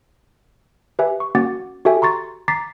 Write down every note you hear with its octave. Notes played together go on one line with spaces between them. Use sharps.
G4 B4 E5 G#5
C#6
A#3 C#4 F#4 F#5 D6 A6
F#4 G4 A4 E5 G5 G#5
A#5 C6 C#6 A6
A#5 D6 A6 B6 C7